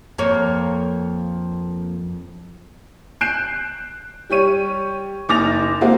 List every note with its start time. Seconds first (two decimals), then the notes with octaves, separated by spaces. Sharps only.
0.18 F2 A#3 C#5
3.21 F#6 G6 C7 D7 E7
4.30 G3 G4 C#5 D#7
5.29 F#1 D#4 D6 A6 A#6 F7
5.81 G#3 A#3 C4 F#4